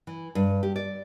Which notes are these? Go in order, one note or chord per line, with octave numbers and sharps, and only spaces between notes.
E3
G2
G4
D5